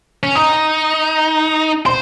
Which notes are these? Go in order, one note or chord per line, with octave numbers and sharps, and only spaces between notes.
C#4
D#4 D#6
C5 C6